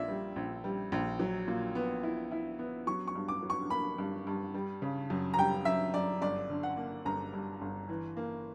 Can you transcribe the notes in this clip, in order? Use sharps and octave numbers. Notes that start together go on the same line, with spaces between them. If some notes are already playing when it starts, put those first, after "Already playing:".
Already playing: A#1 A#2 D5 E5
G3
A#1
G3
A#1
F#3
A#2
B3
E4
E4
B3
F#3 C#6
C#6
G2
D6
F#3
C#6
A#3 B5
G2
G2
G3
C#3
F#2
A#5
G3 G5
F#2 E5
F#2 D5
G1 D5
D3
F#5
A#3
G1 A#5
G2
G1
E3
A#3